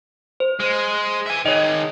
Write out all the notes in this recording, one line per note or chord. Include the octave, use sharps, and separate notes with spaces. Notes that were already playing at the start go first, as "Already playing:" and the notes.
C5
G#3
E5 G#5
D#3 G#4 C#5 D#5